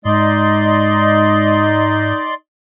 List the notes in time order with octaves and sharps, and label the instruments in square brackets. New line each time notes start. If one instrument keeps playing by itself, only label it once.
[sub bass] G#2 [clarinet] G#3 [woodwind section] D#4 D#5 [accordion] D5 C6